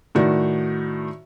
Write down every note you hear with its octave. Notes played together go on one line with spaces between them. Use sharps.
A2 D#3 F#4 D5